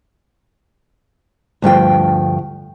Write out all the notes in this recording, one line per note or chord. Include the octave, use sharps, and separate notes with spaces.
D2 G2 F3 G5